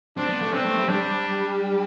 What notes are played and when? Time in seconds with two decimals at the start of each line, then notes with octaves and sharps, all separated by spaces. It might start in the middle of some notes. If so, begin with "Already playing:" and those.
0.17 C4 D4
0.29 B3
0.42 A3
0.53 B3 C4
0.66 A3
0.77 G3
0.89 G3 D4